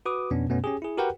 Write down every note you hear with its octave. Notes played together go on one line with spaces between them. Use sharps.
F#4 B4 D6 D#6
F2 B2 B3 C#4 D4
F#2 B2 A3 B3 C#4
C#4 G4 G#4
E4 G#4
F#4 G4 A#4 B4 F#5 G5